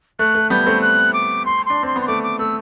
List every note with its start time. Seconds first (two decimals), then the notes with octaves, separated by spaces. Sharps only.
0.19 A3 F#6
0.35 A3
0.50 G3 B3 G6
0.66 A3 C4
0.82 F#6
1.13 D6
1.45 C6
1.66 D4 C6
1.83 C4 C6
1.96 B3
2.02 C6
2.08 A3 D6
2.23 D6
2.39 A3 E6